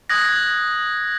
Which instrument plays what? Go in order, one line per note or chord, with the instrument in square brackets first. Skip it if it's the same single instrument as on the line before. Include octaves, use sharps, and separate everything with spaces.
[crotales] D#6 F#6 G#6 A#6